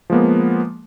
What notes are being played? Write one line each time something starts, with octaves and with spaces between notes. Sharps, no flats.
F3 G#3 A#3 B3